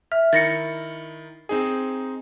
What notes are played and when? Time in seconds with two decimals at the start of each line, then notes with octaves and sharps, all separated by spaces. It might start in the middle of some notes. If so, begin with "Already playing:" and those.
0.12 E5 F6
0.33 D#3 E4 A6 A#6 C#7
1.49 C4 D#4 G#4